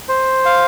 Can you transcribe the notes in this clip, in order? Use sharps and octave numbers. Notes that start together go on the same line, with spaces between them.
C5
F5